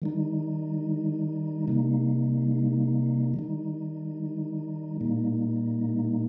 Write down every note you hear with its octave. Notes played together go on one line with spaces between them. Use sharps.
D#3 G3 D#4
C3 G3 A#3 D#4
D#3 G3 D#4
A#2 G3 A#3 D#4